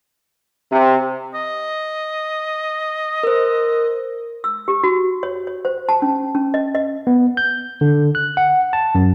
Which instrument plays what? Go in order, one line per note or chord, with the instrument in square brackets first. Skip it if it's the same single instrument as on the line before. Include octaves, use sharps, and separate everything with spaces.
[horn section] C3
[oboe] D#5
[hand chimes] A#4 C5
[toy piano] E6
G4
F#4
C#5
C#5
C5
A5
C#4
C#4
D#5
D#5
[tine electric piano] B3
G6
D3
F#6
F#5
A5
F#2